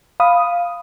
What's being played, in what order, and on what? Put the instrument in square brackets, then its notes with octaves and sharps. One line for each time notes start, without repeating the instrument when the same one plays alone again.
[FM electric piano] F5 B5 D#6